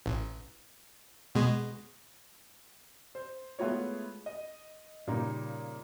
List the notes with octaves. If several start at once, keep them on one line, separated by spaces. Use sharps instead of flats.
A1
B2 G#3
C5
G#3 A3 B3 E4 F4 C#5
D#5
A#2 C#3 G3 A#3 D#4 G4